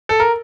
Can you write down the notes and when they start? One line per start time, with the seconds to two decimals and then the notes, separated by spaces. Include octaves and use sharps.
0.09 A4
0.20 A#4